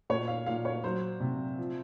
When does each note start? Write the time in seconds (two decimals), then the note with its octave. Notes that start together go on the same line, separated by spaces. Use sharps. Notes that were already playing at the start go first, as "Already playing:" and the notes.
0.10 A#2 C#5
0.28 F5
0.46 A#2 F5
0.65 C#5
0.84 F#3 C5
1.20 C3
1.58 F3